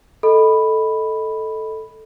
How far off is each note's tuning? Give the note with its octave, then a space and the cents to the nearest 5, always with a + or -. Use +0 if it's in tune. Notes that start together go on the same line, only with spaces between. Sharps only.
A4 +0 D#5 +5 B5 +0